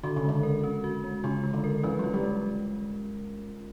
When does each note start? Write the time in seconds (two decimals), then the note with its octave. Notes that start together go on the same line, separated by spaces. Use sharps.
0.04 D3 F#4
0.16 C#3
0.24 D3 G#3
0.43 A#4
0.64 C#4
0.84 F#4
1.04 G#3
1.24 C#3 F4
1.44 G#3
1.53 D3
1.64 A#4
1.83 E3 C#4
1.99 F#3
2.04 F4
2.14 G3
2.23 G#3